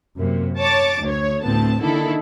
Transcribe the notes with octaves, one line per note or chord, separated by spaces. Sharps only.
F#2 C3 A#3
C#5 A5 D6 A6
D2 C#5
D2 A2 B3 C4 A5
D3 D#3 A#3 E4 A4